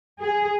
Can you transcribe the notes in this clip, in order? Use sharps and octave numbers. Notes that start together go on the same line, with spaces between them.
G#4